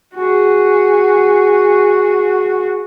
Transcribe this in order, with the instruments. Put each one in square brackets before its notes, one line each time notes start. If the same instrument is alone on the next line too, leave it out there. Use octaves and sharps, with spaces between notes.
[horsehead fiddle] F#4 G#4